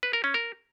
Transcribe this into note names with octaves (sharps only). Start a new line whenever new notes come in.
B4
A#4
C#4
A#4